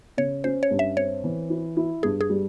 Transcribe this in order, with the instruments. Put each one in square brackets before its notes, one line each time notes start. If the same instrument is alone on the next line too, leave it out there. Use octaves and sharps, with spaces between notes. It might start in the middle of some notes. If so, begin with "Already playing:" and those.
[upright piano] C#3 [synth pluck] C#5
[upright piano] C#4 [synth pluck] C5
[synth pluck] C#5
[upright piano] G2
[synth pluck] E5
[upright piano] C4 [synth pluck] C#5
[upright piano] E3
E4
E4
[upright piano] G2 [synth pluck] G#4
[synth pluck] G#4
[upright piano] G3